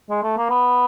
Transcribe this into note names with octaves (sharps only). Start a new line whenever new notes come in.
G#3
A3
A#3
B3